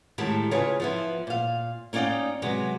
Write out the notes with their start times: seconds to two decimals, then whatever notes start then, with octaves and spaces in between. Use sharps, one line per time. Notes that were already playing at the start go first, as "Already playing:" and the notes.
0.18 A2 D#3 G#3 G4 A5
0.51 C#3 F4 G#4 B4 C#5
0.80 F3 B3 E4
1.27 A#2 F5
1.93 A#3 C#4 D#4 D5 F5 G5
2.42 C3 F#3 G#3 B3